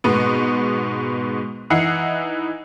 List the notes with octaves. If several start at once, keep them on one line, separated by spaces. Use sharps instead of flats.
G#2 B2 B3
E3 D#4 E4 F#5 C7 C#7